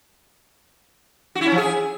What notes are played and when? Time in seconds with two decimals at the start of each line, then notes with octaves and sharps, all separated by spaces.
1.35 F#4
1.41 E4
1.46 C#4
1.52 F3
1.57 G#4